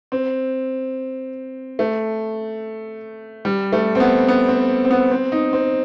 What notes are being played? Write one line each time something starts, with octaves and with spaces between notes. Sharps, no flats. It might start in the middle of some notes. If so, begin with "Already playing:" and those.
C4
A3
G3
A3
C4
B3
B3
C4
C4
B3
C4
D#4
C4